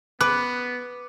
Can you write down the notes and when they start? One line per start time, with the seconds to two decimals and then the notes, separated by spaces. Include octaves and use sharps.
0.21 B3 B4 D6 F#6